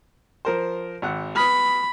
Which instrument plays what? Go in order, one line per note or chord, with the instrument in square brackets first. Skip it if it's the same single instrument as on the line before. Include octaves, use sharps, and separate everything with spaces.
[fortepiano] F3 A#4 C5
G#1 F#5
[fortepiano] B3 D#6 F6 [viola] B5